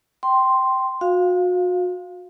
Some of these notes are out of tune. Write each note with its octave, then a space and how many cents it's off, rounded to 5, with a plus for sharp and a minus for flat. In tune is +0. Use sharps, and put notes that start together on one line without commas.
G5 -15 C6 +0
F#4 -35 F5 +0